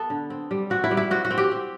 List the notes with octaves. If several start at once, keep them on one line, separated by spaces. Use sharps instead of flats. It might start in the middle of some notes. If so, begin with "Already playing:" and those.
Already playing: B3 A4
D3
C4
G3
C4 F#4
E4
G3
E4
C4 F#4
F#4
C4
G4
C4